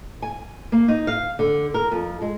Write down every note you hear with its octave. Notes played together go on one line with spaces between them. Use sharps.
G#5
A#3
D#4
F5
D3
A#4
F2
G#3